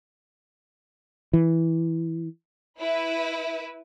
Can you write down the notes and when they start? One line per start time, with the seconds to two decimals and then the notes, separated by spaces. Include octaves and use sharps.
1.33 E3
2.79 E4 B4